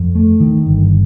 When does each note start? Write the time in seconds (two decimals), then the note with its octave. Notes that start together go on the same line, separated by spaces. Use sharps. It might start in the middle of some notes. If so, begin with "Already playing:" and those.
Already playing: F2
0.15 A3
0.40 D#3
0.66 G1